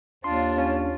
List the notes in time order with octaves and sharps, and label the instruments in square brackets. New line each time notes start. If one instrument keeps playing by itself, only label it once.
[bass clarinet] D#2 [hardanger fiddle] D4 F4 [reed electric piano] C6
[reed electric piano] C#4